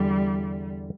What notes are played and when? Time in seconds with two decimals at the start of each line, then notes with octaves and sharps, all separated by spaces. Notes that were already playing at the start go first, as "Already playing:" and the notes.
Already playing: E2 D3 G3